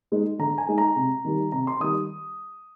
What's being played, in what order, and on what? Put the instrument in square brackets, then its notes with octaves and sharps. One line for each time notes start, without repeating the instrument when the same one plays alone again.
[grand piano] G#3 D#4
D3 A#5
G#5
G#3 D#4
A#5
C3
D#3 G3
C3 A#5
C6
D#3 G3 D#6